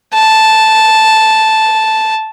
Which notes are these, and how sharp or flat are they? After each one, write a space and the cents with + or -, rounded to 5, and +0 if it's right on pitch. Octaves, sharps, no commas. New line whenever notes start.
A5 -5